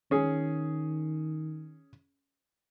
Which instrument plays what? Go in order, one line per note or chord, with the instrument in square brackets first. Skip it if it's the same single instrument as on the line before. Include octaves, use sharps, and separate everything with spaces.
[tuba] D#3 [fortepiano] C#4 G#4